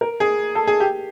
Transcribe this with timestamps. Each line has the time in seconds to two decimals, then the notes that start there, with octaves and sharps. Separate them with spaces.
0.01 A#4
0.20 G#4
0.55 A4
0.67 G#4
0.80 G4